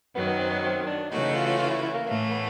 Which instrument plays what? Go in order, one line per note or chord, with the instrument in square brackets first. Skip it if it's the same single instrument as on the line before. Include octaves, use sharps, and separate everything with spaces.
[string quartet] F#2 D#3 F#3 [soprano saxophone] B3
[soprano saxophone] B3
C4
B3
C4
D4
[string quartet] C#3 E3 A3 C#4 F#4 [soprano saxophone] D#4
[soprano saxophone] D#4
F4
F4
F4
E4
E4
A#3
[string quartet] A2 E3 A3 [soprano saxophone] A#3
[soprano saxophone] B3